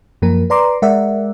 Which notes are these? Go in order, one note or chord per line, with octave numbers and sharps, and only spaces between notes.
F#2 F3 A#3 A#4
B4 D5 A#5 C6 D6
G#3 A#4 D5 E5 F#5